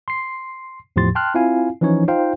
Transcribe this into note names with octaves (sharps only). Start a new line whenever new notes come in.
C6 C7
E2 A2 F3 G4 C6 A6
G5 A5 C6 F6 F#6
C4 E4 F4 F5 G#5
E3 F3 C#4 D#4 C#5
D#4 F4 C5 F5 G5